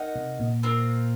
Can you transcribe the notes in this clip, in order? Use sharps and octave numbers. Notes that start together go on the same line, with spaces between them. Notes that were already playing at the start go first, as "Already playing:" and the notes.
Already playing: D#4 A#4 D#5 F#5
C3
A#2
C4 F4 A#4